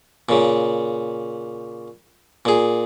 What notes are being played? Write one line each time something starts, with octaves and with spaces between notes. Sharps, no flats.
A#2 C#3
A#2 G#4